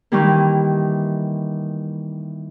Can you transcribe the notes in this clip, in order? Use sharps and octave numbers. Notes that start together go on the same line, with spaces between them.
D#3 E3 G3 A#3